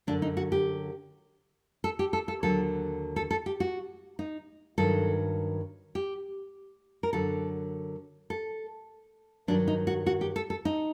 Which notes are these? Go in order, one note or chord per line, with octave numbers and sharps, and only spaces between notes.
F#2 D3 F#3 D4
D#4
F#4
G4
A4
G4
A4
A4
D#2 D3 F#3 A4
A4
A4
G4
F#4
D#4
G2 D#3 F#3 A4
G4
A#4
F#2 D3 F#3 A4
A4
G2 D#3 F#3 D4
D#4
F#4
F#4
G4
A4
A4
D#4